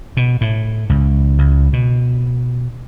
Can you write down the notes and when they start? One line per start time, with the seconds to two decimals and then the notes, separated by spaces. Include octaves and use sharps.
0.17 B2
0.41 A2
0.90 C#2
1.38 C#2
1.73 B2